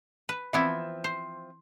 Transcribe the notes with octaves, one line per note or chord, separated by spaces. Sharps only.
B4
E3 F3 B3 C4 E4 E5
C5